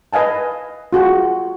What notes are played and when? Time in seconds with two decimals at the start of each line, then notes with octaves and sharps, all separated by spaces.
0.13 B4 D#5 F5 G#5 A5
0.93 F4 F#4 G#4